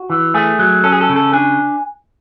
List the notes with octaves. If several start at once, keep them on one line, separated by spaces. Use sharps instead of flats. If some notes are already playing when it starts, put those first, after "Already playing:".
Already playing: F#4
E3
A3 G#4
F#3
C#4 A4
G#4
A4
C#3
A4
D4 G#5